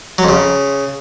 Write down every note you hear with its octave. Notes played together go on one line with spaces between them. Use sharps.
F#3
F2
C#3